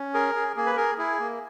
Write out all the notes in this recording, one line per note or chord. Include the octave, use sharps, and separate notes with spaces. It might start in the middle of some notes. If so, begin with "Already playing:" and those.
Already playing: C#4
G#4 A#4
G#4
A#3 G#4
B4
G#4 A#4
E4 G#4
A#3